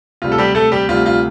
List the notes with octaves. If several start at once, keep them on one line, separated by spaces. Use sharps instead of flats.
D2 C3 G3 F4
A4
G3 G4
A3 A4
G3 G4
D2 C3 G3 F4
F4